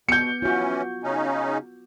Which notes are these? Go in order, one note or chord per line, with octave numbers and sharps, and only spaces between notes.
B2 B3 G6 C#7
E3 C#4 F4 F#4
C#3 C#4 D#4